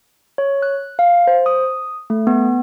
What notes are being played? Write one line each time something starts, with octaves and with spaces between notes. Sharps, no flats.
C#5
F#6
F5
C5
D#6
A3
B3